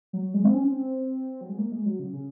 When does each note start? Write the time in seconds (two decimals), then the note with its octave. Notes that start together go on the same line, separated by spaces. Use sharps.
0.13 F#3
0.34 G#3
0.44 C4
0.54 C#4
0.64 C4
1.41 F#3
1.49 G#3
1.58 A#3
1.72 G#3
1.86 F#3
1.99 C#3
2.13 C#3